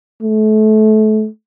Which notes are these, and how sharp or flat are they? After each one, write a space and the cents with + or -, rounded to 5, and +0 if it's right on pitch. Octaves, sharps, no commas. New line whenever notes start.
A3 -30